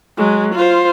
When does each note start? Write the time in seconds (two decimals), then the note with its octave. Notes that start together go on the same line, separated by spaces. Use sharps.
0.17 F#3 G#3
0.55 F4 C5